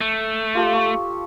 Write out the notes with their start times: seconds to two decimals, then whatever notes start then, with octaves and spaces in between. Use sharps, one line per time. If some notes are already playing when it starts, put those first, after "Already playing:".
0.01 A3
0.55 F4 G4 A4
0.73 C#6